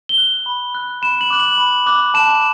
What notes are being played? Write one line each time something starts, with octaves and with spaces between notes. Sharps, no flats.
G7
F#6
B5
F#6
B5 E7
F#7
D6 F#6
F#7
B5
D6 F#6
A5 E7